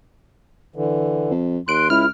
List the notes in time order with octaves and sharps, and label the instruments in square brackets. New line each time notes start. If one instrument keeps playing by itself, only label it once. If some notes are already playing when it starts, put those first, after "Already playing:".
[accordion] D3 E3
[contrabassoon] F2
[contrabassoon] D#2 [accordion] C6 [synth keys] F#6 D7
[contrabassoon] C#2 [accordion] E4 [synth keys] F6